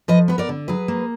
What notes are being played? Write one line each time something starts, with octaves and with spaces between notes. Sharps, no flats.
F3 B4 D#5
B3 B4
A#4 D5
D3
F#3 G#4 B4
A#3